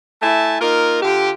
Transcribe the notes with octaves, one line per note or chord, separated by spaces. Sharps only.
A3 E4 E5 G#5 A5
A#3 D#4 F4 A#4
D3 F4 G4